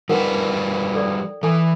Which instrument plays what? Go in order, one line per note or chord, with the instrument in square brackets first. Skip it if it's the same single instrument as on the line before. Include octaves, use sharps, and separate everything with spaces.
[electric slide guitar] F3 G3 B4 [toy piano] D#4 A#4 F#5
[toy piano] A4 D5 G5
[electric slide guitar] E3 [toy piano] A4 G5 G#5